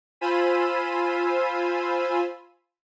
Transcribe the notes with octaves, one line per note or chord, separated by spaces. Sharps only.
F4 C5 G#5 B5 E6 D#7